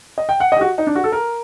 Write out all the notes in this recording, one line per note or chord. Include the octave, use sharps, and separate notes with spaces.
D#5
G5
F#5
D#5
G4
F#4
D#4
D4
F#4
A4
A#4